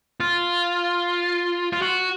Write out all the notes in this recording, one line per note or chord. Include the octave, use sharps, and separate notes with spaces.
F4
F4
F#4